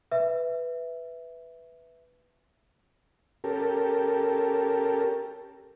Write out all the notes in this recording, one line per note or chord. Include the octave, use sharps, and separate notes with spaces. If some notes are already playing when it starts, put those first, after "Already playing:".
B4 E5
C#4 G4 A4 A#4